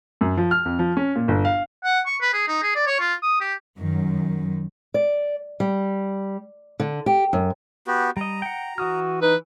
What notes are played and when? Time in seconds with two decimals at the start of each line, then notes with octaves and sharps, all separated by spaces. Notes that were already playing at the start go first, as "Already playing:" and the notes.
0.21 F#2
0.37 F3
0.51 F6
0.65 F2
0.79 F3
0.97 C#4
1.15 A#2
1.28 G1
1.45 F5
1.84 F#5
2.06 C#6
2.21 B4
2.33 G#4
2.48 D#4
2.63 G#4
2.75 D5
2.87 C#5
3.00 F4
3.22 D#6
3.41 G4
3.79 F#2 D#3
4.94 D5
5.60 G3
6.80 D3
7.06 G4
7.33 F#2
7.87 B3 F#4 G4
8.17 G3 D#5 A#5
8.42 F#5 G5
8.78 E3 F#4 D#6 F6
9.22 D#4 B4